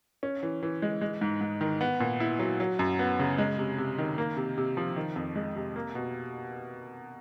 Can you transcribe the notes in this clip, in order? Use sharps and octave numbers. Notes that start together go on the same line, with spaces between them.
C#4
E3
E3
G#3
G#3
G#2
G#2
D#3
B3
A#2
E4
F#3
F#3
F#2
B3
C#3
G#3
C3
C3
D#3
A#3
C3
C3
F3
D#3
F2
G#3
C3
A#3
B2